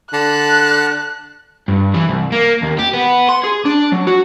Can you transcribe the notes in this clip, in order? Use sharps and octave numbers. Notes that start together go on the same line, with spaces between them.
D3 A5 F#6
G2
E3
C2
A#3
D#2
G4
B3
C6
G#4
D4
F#3
F#4